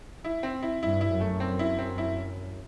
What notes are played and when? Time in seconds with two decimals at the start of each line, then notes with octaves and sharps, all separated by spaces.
0.24 E4
0.43 C4
0.62 E4
0.82 G2 E4
1.01 E4
1.12 F#2
1.21 A3
1.40 C4
1.59 E4
1.79 C4
1.98 E4